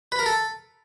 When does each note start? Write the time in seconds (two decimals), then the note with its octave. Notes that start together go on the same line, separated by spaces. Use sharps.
0.12 B4
0.19 A#4
0.26 A4